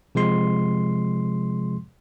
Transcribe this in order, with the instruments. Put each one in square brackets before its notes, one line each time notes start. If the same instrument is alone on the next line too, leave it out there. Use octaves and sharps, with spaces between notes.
[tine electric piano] C3 F3 G#3 C6